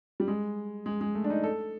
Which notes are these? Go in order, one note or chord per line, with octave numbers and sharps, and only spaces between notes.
G3
G#3
G#3
G#3
A3
D4
D#4
A4